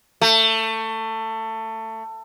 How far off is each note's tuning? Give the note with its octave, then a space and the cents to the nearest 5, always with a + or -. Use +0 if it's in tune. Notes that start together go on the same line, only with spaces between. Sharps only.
A3 +20